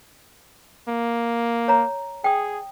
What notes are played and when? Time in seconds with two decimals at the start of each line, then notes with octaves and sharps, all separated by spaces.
0.89 A#3
1.68 C#5 A#5
2.24 G#4 G5 D#6